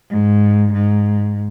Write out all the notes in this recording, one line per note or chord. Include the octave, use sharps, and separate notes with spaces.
G#2
G#2